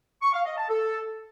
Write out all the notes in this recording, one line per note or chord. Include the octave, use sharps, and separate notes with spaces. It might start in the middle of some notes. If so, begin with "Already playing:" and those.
C#6
F5
D#5
A5
A4